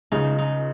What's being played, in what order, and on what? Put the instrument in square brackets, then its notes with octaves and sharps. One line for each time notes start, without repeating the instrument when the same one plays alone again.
[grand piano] C#2 C#3 [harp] D#4
[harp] D#4